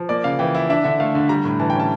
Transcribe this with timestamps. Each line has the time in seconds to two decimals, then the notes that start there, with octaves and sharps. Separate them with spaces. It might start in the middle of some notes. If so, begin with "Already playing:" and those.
Already playing: F3
0.09 A#3 D5
0.24 C#3 F5
0.39 E3 G5
0.55 E4
0.70 D4 E5
0.84 D3 E5
1.00 A3 F5
1.15 D3
1.29 G3 A#5
1.45 A2
1.60 E3 A5
1.70 G5
1.75 C#4 A5